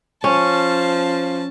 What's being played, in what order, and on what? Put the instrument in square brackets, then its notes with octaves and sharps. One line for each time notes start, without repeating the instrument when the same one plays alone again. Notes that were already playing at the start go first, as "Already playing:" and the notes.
[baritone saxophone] F3 [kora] C#4 [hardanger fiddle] A5